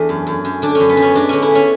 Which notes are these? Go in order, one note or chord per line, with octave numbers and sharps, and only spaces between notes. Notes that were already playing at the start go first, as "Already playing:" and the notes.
Already playing: E2 A3 D4
F#2
F#2
F#2
D3 D4
C#4
F#2
B3
F#2 C#4
G#3 D4
D3 C#4
E4
B3 C#4